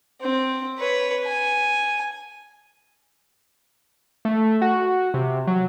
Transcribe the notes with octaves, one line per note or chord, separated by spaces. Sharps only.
C4
B4 C#5
G#5
A3
F#4
C3
F#3